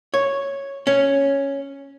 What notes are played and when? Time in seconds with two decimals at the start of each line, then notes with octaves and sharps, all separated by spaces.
0.14 C#5
0.87 C#4